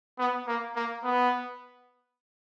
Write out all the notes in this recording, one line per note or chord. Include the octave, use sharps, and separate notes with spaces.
B3
A#3
A#3
B3